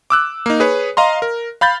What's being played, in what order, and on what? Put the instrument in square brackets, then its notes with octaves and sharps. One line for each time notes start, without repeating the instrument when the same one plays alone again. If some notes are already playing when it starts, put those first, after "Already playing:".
[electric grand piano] D6 E6 F#6
A#3 D#4
G#4 B4 C#5
D#5 F5 A#5 C6
A#4
F5 B5 G6 A6